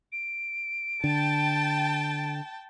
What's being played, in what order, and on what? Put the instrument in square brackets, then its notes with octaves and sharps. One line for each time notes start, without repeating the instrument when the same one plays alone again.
[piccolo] D7
[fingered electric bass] D3 [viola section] G5 A5